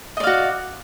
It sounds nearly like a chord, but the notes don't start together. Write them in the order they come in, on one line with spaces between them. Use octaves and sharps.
D#5 D5 F5 F#4